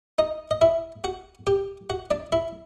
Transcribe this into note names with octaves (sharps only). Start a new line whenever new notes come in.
D#4 D#5
D#5
E4 E5
F#4 F#5
G4 G5
F#4 F#5
D4 D5
E4 E5